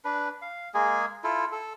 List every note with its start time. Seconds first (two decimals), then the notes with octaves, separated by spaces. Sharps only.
0.05 D4 B4
0.42 F5
0.74 G#3 A#3 G#4
1.24 E4 F4 A4
1.52 A4